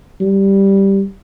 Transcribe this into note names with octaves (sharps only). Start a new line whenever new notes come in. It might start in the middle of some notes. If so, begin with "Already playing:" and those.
G3